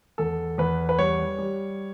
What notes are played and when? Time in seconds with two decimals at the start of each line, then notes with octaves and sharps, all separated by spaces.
0.18 E2 A4
0.58 E2 B4
0.89 B4
0.98 G3 C#5
1.38 G3